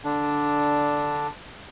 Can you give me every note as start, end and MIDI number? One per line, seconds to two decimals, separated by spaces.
0.04 1.27 50
0.04 1.27 62